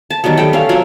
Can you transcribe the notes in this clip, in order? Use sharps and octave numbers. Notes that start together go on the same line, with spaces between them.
A5
D#3 F#3 G3 B3
D#3 G3 A3 G5
C#4 A4 F5
C3 F#3 F4 F#4